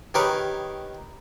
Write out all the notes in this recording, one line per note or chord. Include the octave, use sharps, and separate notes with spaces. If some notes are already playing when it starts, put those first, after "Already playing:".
D#3 G4 G#4 A#4 B4 C#5